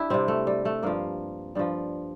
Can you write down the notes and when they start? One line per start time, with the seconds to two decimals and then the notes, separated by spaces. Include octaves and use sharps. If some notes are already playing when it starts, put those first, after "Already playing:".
Already playing: D4 E4 G4
0.10 C3 G3 C4
0.28 A3
0.47 G3
0.65 A3
0.83 G2 F3 A#3
1.55 G2 F3 G3